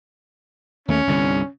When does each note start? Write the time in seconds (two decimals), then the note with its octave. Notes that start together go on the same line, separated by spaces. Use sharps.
0.88 D#2 A3 C#4
1.07 G1 C2 D3